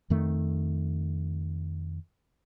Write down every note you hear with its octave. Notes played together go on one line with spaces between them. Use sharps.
F2 D#3 A3